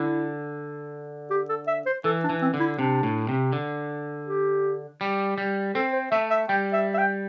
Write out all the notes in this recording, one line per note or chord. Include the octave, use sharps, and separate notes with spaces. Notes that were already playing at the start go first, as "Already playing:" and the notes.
Already playing: D3 E4
G4
A4
E5
C5
E3 A4
D4
E3
C4
D3
E4
C3 D4
A2
C3
D3
G4
G3
G3
C4 A4
C5
A3 E5
E5
G3 G5
E5
E5
G5